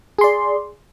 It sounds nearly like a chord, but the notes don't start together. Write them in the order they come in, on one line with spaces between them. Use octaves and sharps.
G#4 C6 D5